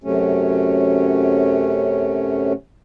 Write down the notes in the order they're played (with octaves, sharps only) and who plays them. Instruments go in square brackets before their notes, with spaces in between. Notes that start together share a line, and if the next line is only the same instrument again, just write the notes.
[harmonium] F#2 C3 F#3 A3 C#4